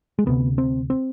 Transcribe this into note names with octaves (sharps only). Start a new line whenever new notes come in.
G#3
D2 C3 B3
C4
C4